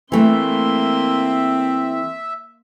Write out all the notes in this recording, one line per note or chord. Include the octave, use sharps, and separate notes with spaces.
E3 A3 A#3 C4 E5 C6